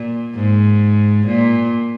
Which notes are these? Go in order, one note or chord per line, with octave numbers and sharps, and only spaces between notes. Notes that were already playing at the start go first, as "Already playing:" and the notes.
Already playing: A#2
G#2
A#2